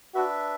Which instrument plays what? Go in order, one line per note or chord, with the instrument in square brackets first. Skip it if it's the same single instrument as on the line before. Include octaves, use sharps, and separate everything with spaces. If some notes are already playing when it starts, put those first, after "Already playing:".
[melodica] D4 B4 E5 [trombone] F#4